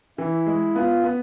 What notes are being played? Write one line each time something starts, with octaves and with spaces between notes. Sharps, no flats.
E3 E4
G#3
B3 F4
B3